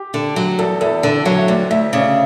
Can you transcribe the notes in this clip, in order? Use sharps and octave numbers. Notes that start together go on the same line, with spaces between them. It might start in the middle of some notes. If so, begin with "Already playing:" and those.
Already playing: G4
D3
F#3
E2 A4
E2 A4
D3 A4
F#3 C#5
E5
D2 D5
D2 E5
C#3 D5